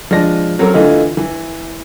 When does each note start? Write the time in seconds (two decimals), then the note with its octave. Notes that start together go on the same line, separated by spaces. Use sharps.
0.11 F3 G#3 D4 A#6
0.59 F#3 C4 C#4 A4 A#4
0.74 D3 E3 A3 D#4 F4
1.17 E3